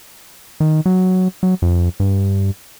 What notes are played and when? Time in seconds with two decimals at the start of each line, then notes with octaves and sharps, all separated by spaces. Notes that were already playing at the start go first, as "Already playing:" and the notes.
0.60 D#3
0.86 F#3
1.43 F#3
1.62 F2
2.00 G2